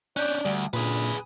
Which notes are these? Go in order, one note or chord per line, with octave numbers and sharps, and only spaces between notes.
C#4 D4 D5 F#6 G6
D2 G3
F#1 A#2 D3 D4 G#4 B4